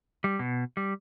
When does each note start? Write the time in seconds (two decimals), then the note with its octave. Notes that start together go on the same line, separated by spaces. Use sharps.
0.24 G3
0.39 B2
0.77 G3